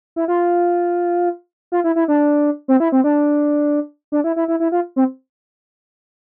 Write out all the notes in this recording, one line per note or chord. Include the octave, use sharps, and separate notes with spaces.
E4
F4
F4
E4
E4
D4
C4
E4
C4
D4
D4
E4
E4
E4
E4
F4
C4